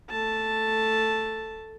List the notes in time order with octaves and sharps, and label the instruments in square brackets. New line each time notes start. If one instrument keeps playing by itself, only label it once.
[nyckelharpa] A3 A5